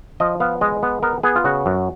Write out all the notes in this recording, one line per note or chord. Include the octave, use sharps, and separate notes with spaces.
F3 D#5
B3 F5
G#3 D#5
B3
B3 A#4
B3 G#4
F4
C#3 F#4
F#2